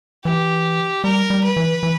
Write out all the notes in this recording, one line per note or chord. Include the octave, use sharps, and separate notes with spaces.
E3 G4
G3 A#4
G3
B4
E3
E3